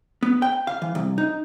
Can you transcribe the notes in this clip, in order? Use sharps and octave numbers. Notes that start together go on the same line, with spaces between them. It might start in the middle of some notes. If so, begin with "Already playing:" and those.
B3
G5
F5
E3
C2
D#4